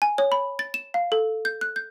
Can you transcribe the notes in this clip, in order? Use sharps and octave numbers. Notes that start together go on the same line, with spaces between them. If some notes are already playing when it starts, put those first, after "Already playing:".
G#5
C#5
B5
A6
E7
F5
A4
G6
F#6
G6